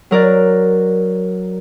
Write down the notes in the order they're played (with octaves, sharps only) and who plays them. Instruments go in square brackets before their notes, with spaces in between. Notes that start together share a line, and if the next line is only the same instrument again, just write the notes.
[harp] F#3 A#4 D5